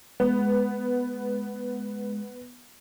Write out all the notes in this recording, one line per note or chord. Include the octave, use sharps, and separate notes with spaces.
G#3 B3